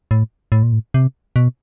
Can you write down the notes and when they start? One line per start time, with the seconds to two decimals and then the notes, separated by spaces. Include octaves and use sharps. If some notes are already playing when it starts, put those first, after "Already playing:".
0.11 A2
0.52 A2
0.63 A#2
0.73 A2
0.94 C3
1.36 B2